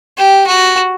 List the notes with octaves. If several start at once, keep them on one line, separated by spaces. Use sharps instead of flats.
G4
F#4